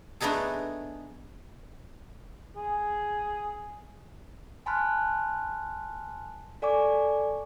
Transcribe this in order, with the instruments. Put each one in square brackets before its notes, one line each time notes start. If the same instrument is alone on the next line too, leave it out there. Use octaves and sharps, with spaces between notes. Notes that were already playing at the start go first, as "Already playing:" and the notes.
[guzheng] A3 B3 D4 D#4 G#4 A4
[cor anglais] G#4
[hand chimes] G#5 A5 B5 C6 F6 F#6
A4 D5 G#5 C#6 D6